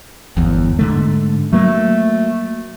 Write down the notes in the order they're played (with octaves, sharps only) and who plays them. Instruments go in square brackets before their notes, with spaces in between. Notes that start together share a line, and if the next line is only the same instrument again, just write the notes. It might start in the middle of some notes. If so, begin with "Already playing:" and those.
[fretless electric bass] G1 E2
G#2 D3 A3
[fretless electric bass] F#3 A#3 [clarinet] A3